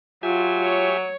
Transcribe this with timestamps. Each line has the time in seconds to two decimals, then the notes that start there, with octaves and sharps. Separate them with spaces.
0.23 F#3 F4 G4 E5 G#5
0.60 C#5